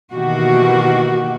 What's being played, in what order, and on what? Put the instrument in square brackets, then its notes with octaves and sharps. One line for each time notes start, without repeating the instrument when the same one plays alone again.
[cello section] B2 D#3 E3 A#3 F#4 G4